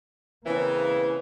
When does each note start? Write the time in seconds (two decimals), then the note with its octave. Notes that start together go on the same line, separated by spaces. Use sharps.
0.46 C#3 E3 A#3 C4